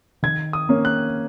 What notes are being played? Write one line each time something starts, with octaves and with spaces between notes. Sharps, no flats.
D#3 G#6
D#6
A#3 C#4
F#6